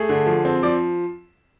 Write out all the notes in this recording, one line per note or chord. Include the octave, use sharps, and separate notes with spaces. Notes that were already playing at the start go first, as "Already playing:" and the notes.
Already playing: A3 G#4
D3
F3
C4
F3 D5